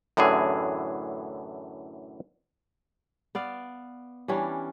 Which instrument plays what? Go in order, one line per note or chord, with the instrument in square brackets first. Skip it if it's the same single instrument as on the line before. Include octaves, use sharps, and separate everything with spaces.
[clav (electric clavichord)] F#2 A2 D3 E3 G#4
[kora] B3 D5 F5
E3 G3 C#4 D4